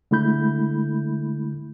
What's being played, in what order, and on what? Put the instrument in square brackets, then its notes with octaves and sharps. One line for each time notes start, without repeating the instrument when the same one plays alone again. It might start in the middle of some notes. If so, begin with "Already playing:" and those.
[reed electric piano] D3 G#3 A3 E4 B5 G6